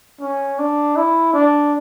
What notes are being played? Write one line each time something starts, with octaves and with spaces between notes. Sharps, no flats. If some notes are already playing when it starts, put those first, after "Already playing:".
C#4
D4
E4
D4